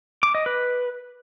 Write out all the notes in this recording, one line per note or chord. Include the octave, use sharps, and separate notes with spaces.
D6
D#5
B4